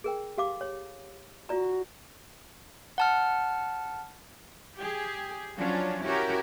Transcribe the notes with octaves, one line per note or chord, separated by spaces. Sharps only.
G#4 A#4 G5
G4 F5 D6
C#5
F4 F#4 D5 A#5
F#5 A5 F6
G4 G#4
F3 F#3 C#4 D4 F4
C#4 E4 F#4 G4 A#4